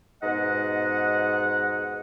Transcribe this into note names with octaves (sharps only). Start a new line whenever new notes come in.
G#2 B2 D#5 F#5